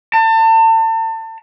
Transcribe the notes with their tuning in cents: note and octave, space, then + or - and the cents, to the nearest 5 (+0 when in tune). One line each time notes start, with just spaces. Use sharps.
A5 +35